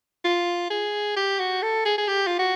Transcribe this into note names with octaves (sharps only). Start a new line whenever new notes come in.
F4
G#4
G4
F#4
A4
G#4
G#4
G4
F4
F#4